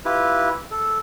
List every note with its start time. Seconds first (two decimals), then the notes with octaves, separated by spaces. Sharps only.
0.05 E4 F4 G4 B4
0.71 A4